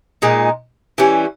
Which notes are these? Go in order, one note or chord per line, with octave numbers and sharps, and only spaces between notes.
A#2 G#3 D#4
E3 G3 C#4